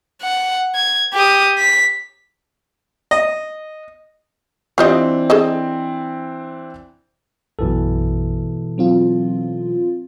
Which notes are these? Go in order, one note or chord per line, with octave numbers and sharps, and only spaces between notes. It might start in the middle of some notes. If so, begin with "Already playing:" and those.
F#5
G#6
G4 D#6
B6
D#5
E3 C4 D4 F4 G4 D#5
G#4 A4 D#5
A#1 F#2 B2 E3 A4
F#3 C4 F4